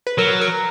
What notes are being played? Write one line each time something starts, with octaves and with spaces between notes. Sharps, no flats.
B4
F#3 A#4
A#4